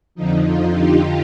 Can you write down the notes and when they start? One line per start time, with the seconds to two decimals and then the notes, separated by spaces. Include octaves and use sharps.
0.15 F2 D3 F3 D#4
0.44 F4
0.73 G4